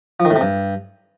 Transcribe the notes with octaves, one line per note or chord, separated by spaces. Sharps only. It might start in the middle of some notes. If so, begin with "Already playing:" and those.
F3
D#3
A2
C3
G2